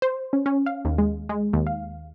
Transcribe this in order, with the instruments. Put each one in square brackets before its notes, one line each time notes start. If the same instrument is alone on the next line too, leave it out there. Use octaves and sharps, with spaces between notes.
[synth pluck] C5
C#4
C#4
F5
D#2
G#3
G#3
D#2
F5